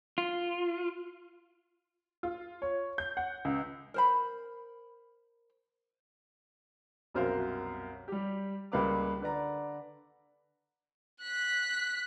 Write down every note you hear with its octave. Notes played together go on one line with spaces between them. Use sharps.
F4
F4
C#5
G6
F#5
C#2
A#4 C5 B5
C2 F#2 B2 A#4 C5 F5
G3 G4
C#2 G3 A#3 B4 F5 D6
D3 B4 D5 A#5
F#6 B6